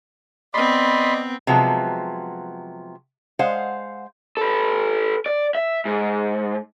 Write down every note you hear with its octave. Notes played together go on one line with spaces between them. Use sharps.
B3 C4 D5 D#5 B5 C6
C3 F3 F#3 G#3 B3
G#3 C5 F5 F#5
A4 B4
D5
E5
G#2